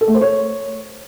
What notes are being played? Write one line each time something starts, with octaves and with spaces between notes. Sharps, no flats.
A4
A3
C5
C#5